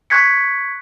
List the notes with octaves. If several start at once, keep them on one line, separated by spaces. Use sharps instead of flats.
C#6 F#6 G#6 B6 C#7